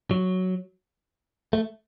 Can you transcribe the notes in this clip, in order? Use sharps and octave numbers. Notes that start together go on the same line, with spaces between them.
F#3
A3